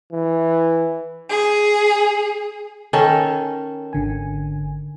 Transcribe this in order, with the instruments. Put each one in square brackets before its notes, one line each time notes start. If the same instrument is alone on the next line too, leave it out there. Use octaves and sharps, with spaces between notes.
[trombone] E3
[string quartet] G#4
[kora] D#3 C#4 A4
[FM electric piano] G#1 D3 G#5